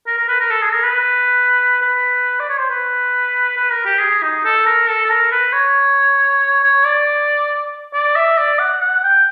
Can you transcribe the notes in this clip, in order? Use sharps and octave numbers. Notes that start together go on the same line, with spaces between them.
A#4
A#4
B4
A#4
A4
G#4
A#4
B4
B4
D5
C#5
C5
B4
B4
A#4
G4
G#4
D#4
A4
A#4
A4
A4
A#4
B4
C#5
C#5
D5
D5
E5
D5
F#5
F#5
G5